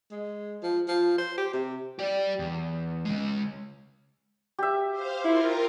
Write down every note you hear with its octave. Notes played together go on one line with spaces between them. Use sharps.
G#3
F3
F3
C5
G4
C3
G4 D5
E2
C#3 G#3
G4 E5
C5 F5
E4 F4 A#4